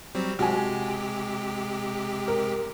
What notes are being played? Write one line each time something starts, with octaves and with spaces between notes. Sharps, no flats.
F#3 G3 C4
C3 G#3 F#4 G4 G#5
A#4